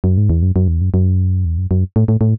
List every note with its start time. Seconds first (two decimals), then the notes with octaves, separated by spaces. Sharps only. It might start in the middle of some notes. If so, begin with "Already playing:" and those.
0.04 F#2
0.17 G#2
0.30 E2
0.42 F#2
0.56 F#2
0.68 E2
0.81 F#2
0.94 F#2
1.45 E2
1.58 F#2
1.71 F#2
1.96 A2
2.08 A2
2.21 A2